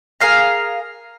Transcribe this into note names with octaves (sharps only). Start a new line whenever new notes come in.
G#4 A#4 F5 A#5